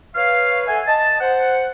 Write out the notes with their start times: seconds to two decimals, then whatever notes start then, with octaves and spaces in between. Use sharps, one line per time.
0.15 B4 C#5 F5
0.67 A4 E5 F#5 G#5
0.87 D#5 A5
1.20 C5 F#5